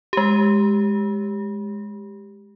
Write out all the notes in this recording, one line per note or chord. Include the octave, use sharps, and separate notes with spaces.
G#3 G4